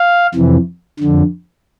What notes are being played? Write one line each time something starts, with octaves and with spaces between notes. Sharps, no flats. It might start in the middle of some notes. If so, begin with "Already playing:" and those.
Already playing: F5
F2 C3 E3
F2 D3